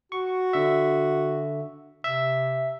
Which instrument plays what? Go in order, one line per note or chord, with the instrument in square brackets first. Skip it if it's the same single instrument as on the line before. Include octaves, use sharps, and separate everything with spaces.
[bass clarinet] F#4 [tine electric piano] C#6
[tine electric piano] D3 E5
[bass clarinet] C3 [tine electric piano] E5